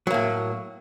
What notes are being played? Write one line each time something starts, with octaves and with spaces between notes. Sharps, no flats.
A2 F#3 A#3